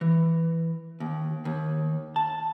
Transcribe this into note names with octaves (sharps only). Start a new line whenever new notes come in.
E3
D#2
D#2
A5